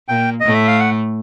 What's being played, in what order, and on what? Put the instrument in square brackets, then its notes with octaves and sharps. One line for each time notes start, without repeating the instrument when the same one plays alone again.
[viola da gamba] A#2 A#3 [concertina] G5
[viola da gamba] A2 A3 [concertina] D#5
[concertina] E5
F5
F#5